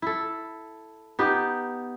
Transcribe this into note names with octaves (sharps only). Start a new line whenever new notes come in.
E4 A4
B3 D#4 G4